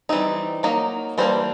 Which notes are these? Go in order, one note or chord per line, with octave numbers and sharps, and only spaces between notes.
E3 G3 C4 D#4
F#3 A#3 D#4
E3 G3 A#3 D4 C5